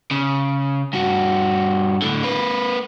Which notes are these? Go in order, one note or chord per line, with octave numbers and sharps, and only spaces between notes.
C#3
G2 F#4
A2 D3
A#3 B4